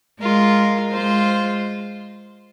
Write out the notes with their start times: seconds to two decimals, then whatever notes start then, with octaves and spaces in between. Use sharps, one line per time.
0.20 G#3 F4 A#4
0.91 G#3 F4 C5